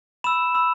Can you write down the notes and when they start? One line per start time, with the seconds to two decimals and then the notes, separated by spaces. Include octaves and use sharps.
0.24 B5 E6 E7
0.55 B5 E6